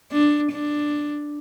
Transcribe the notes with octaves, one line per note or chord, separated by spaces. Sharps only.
D4
D4